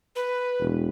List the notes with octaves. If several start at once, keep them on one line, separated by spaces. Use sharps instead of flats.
B4
E1